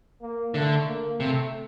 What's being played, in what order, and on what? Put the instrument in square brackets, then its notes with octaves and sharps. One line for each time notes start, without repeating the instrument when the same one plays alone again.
[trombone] A#3
[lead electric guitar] D3 [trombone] A3
[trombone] A#3
[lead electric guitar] C3 [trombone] A3